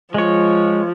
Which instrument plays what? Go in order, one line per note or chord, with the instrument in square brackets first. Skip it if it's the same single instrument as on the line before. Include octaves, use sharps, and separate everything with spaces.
[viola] F3 [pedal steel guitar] G#3 C#5